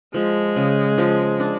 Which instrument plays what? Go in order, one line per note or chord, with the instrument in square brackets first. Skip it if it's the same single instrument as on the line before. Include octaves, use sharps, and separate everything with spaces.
[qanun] F3 [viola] G#3
[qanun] C#3
F3
D4